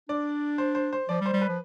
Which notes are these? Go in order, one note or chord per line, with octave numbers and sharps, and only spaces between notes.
D4 D5
C5
C5
C5
F3 D5
G3
C5
G3
B4
F3